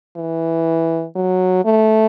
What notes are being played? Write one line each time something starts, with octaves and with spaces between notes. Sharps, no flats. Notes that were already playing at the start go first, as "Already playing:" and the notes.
E3
F#3
A3